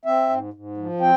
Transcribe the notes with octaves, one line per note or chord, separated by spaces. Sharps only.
C4 E5
G#2
G#2
F3
C4 G5